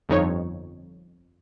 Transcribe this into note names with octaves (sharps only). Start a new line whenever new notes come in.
G1 F2 D#4 C#5